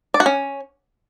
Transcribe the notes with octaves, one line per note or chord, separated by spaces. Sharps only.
D5
F#4
C#4